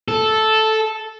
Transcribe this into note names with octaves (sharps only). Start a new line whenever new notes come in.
A4